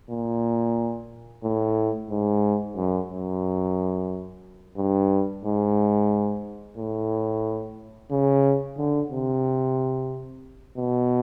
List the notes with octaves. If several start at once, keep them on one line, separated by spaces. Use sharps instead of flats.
A#2
A2
G#2
F#2
F#2
G2
G#2
A2
C#3
D3
C3
B2